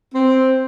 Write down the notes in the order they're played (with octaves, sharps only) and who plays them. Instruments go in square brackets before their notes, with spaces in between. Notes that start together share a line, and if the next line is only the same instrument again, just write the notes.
[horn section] C4